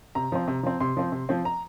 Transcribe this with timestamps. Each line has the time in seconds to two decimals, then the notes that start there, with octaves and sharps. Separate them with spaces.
0.15 C3 A#5
0.32 F3 C4
0.48 C3
0.63 F3 C4
0.80 C3 C6
0.97 F3 C4
1.12 C3
1.29 F3 C4
1.45 A#5